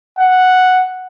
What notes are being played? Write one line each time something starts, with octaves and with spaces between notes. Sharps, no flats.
F#5